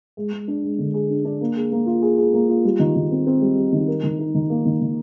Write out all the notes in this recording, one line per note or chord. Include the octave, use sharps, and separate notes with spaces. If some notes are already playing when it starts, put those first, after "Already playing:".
G#3
G#3
D4
G#3
D3
G#4
D4
D4
A#3
G#4
A#3
F4
G#4
G#4
A#3
F4
G3
D#3
D#3
C4
C4
G3
G3
D#3
A#4
D#3
D#4
D#3
A#3
D#3
D#3